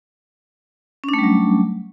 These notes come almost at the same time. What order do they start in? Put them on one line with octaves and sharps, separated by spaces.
C#4 D4 A3 G3 F#3